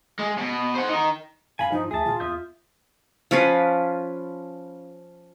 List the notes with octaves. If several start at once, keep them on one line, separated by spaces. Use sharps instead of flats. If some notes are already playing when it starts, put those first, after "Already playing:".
G#3
B2
C5 F#5
D#4 A#4
F#2 F5 G#5 B5
G2 F3 D#4
D2 G#4 E5 A5
A#2 F4
E2 E5 D#6 G6
F3 C#4 F4 B4